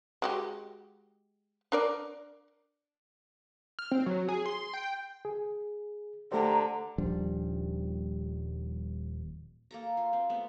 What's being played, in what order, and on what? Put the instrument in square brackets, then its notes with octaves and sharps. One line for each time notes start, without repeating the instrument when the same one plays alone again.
[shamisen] G#3 F#4 G4
D4 A#4 D5
[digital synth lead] F6
C4
F#3
G#4
C6
G5
[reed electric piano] G#4
[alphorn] D3 [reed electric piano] A3 G4 C5 [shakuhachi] A#5
[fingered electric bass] D#1 F3 G3 D4
[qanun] A#3 A4 A#5
F4
C4
A3 B3